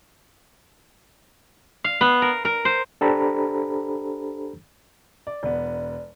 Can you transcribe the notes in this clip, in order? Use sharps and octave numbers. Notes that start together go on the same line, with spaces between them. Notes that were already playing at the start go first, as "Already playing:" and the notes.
F5
B3
A#4
A#4
C5
D4 G4 A4 C5 A#5 B5
D5
E1 B3 D5